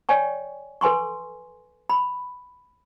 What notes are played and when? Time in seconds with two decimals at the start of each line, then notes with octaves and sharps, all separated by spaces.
0.09 C#5 D5 G5 G#5 C#6
0.81 A4 B4 G#5 C6 C#6
1.90 B5